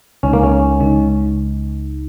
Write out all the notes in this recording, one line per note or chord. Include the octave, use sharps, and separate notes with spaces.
C#2 C#3 G#3 C#4 D#4
A#3
C#4
C#2 C#3 G#3 D#4